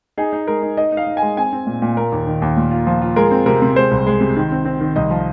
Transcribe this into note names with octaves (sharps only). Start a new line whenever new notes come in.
D#4 G#4
D#4
G#3 A#4
D#4
D#4 D#5
D#4
F5
D#4
G#5
G#3
C4 G#5
C4
A#2
A#2
A#3 A#4
D#2
D#3
D#2
A#2
F4
F3
F4
G#3 A#4
C4
C3 A#4
C3
G#3 C5
C2
G#3
C3
D#3
C4
C4
D#3
C2 D#5
F3